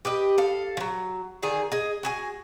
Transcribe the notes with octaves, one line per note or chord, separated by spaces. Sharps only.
G4 B4 D#5
A4 F5
F3 F#3
D3 D#3 G#4 G#5
G#4 D#5
F#4 G#4 G#5